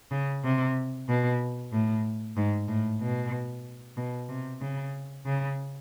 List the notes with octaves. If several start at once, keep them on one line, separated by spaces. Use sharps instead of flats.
C#3
C3
B2
A2
G#2
A2
B2
B2
C3
C#3
C#3